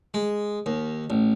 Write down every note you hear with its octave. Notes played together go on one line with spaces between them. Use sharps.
G#3
D#2
A1